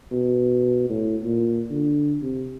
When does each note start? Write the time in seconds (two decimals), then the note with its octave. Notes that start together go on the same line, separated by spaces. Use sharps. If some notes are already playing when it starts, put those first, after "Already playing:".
0.12 B2
0.90 A2
1.23 A#2
1.71 D3
2.22 C3